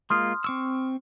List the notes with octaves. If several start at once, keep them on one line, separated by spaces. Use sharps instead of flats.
G#3 A#3 F4 C6 D#6 F6
C4 C#6 E6